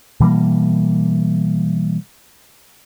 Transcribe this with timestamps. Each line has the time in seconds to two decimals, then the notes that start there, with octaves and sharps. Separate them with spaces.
0.20 B2 E3 G3 A#3